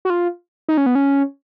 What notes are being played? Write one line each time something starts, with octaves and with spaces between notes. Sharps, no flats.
F#4
F4
D#4
C#4
B3
C#4